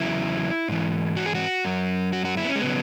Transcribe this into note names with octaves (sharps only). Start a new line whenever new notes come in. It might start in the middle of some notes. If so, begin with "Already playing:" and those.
Already playing: E2 C#3 F#3 E4
G#2 E3
F#4
G#4
F#4
F#2 F#3
F#4
F#4
E4
B3
C#4
G#3
C#3 F#3 B3